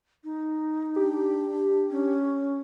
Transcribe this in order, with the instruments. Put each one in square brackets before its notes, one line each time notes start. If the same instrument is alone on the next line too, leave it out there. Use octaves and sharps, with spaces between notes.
[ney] D#4
[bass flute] D4 [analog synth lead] G4
[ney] C#4